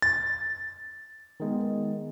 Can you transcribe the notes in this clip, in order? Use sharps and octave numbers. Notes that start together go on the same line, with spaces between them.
A6
D#3 G#3 B3